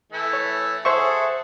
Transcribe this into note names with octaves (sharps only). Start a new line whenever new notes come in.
E3 A3 E4
C#5
G#4 A4 C5 E5 F#5 C#6